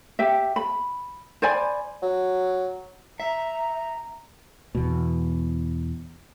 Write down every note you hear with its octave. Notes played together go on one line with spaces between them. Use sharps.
G4 E5
B5
C5 D5 G#5 B5
F#3
E5 A#5
E2 B2